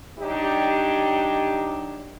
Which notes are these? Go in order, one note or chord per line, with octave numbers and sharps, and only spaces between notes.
F#3 D4 D#4 G4